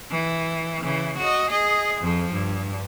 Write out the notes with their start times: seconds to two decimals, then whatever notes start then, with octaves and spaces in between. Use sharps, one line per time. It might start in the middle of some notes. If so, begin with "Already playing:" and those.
0.11 E3
0.81 C#3 E3
1.18 F#4 D#5
1.51 G#4 D#5
2.01 F2 F3
2.33 G2